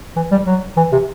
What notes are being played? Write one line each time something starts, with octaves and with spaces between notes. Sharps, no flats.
E3
G3
F#3
E3
C3